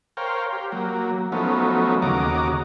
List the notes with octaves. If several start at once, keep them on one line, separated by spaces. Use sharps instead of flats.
A#4 C5 C#5 F5 G5
G4
F#3 A#3
F3 F#3 A3 B3 C#4 D#4
D#2 C#3 F#4 D#5 A#5 D6